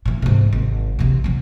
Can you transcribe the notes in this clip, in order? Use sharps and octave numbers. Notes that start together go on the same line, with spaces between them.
A#2 E3
G#2 C3
G#1
C3 E3
C3 F#3